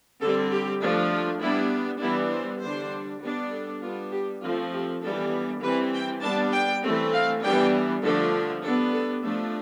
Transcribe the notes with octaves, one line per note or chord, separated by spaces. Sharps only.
D3 G3 C4 A4
G4
F3 A3 D4
F4
G3 B3 D4 E4
E3 G3 B3 D4 E4
C5
D3 G3 D4 C5
G3 B3 D4
A4
G3 B3 D4 F4
G4
F3 A3 C4 F4
G4
E3 G3 B3 D4 A4
E3 G3 C4 B4
G5
G3 B3 D4 A5
G5
E3 A3 C4
F5
E3 G3 B3 D4 G5
D3 F3 A3 D4 A4
G3 B3 D4 A4
A4
F3 A3 D4 A4